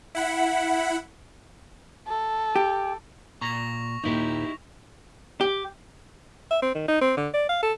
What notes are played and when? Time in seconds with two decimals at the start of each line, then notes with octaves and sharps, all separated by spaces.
0.15 E4 F#5 B5
2.07 A4
2.56 G4
3.41 A#2 A#5 C#6 A#6 F7
4.04 D#2 A#2 D#4 E4 G4
5.41 G4
6.51 E5
6.62 C4
6.74 D#3
6.88 D#4
7.02 C4
7.17 D3
7.34 D5
7.49 F5
7.63 A4